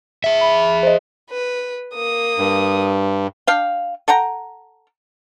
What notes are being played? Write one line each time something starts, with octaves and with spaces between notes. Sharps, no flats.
G#4 E5
B5
C5 D#5
B4
A#3 D#6
G2
D4 F5 G5
A4 F#5 G5 A#5